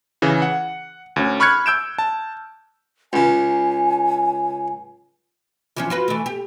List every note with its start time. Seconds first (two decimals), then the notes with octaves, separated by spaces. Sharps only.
0.22 C#3 E3
0.42 F#5
1.16 D2 C#4
1.40 B5 C#6 F6 F#6 G#6 C#7
1.66 E6 G6 D7 E7
1.98 A5
3.13 C#2 C#3 G#5
5.76 E3 F3 C#4
5.90 F4 F#4 B4
6.08 E3 A3
6.26 G4